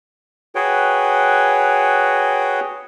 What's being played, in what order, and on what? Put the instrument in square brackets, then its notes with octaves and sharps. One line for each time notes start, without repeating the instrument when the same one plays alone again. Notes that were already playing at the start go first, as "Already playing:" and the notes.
[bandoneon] F#4 G#4 B4 C#5 G5